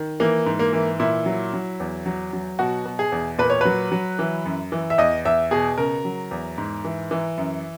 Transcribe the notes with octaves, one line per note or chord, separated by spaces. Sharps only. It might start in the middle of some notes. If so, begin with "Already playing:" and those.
Already playing: D#3
E3 A#3
G#2
A#3
E3
A#2 E4
F#3
F#3
E2
F#3
F#3
B2 F#4
B2
G#4
E2
A#2 B4
C#5
F#3 B4
F#3
E3
F#2
E3
E5
E2 D#5
E2 E5
B2 G#4
C#3 A#4
F#3
E2
G#2
E3
E3
F#2